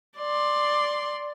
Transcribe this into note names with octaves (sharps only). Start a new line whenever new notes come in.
D5 C6